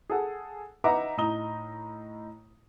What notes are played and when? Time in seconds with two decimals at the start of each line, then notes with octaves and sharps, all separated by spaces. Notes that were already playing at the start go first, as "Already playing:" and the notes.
0.10 G#4 A4 F#5
0.84 D#4 B4 E5 F#5 A#5 D6
1.17 A2 D#4 A#5 D#6 G7